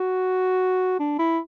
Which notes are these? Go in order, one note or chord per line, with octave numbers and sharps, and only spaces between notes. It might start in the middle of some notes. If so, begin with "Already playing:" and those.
Already playing: F#4
D4
E4